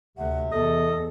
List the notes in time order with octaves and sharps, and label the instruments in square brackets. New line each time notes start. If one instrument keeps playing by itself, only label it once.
[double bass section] D2 [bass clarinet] C3 [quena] F#5
[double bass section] E2 [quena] A4 [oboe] D#5